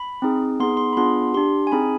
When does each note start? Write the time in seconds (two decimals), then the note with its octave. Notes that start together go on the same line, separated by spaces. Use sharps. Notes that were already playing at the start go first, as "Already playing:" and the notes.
Already playing: B5
0.22 C4 D#4 G#4
0.60 B3 D#4 G#4 C6
0.77 C6
0.93 B5
0.97 B3 D4 F4 G#4 C6
1.34 D4 G4 C6
1.67 G#5
1.72 C4 D#4 G#4 B5